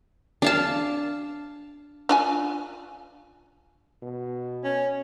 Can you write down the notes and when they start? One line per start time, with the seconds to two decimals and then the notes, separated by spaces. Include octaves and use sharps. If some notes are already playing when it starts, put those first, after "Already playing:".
0.42 D4 F5 A5
2.09 D4 F4 G#5
4.02 B2
4.64 C#4